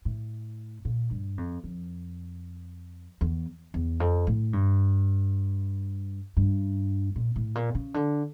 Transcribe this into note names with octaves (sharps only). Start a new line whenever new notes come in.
A2
A#2
G2
F2
F2
E2
E2
F2
A2
G2
G2
A#2
A2
A#2
C#3
D3